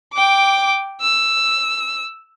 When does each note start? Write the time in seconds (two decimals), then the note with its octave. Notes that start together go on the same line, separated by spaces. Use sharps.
0.13 G5 D6
1.01 E6